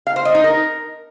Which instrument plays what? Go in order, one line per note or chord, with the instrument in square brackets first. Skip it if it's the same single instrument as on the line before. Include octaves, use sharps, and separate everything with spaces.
[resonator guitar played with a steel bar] F5
C5
D#5
D#4
A#4